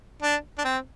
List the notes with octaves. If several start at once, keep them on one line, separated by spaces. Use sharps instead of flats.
D4
D4
C4